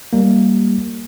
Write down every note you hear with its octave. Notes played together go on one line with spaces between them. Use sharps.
G3 A#3